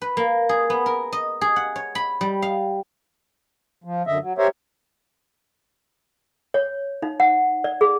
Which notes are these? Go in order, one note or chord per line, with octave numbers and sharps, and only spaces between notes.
B4
A#3
G#4
B3
A#4
D#5
G#4
F#5
C#5
B5
G3
F5
F3
F#2 D3 D#5 E5
F#3
G4 A#4 C5 C#5 E5
C#5
D#4
F#5
D5
G#4